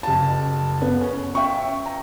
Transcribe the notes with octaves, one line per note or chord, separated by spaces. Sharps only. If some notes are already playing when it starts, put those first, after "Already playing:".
F#1 A5
B3
C#4
E5 G5 C#6
A#5